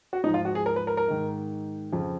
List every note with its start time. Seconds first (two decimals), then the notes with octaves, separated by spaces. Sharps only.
0.13 F#4
0.24 G#2 D#4
0.27 F3
0.34 F4
0.45 F#4
0.55 G#4
0.66 A#4
0.76 B4
0.87 A#4
0.97 A#4
1.08 G#2 D#3
1.93 F2 C#3 F3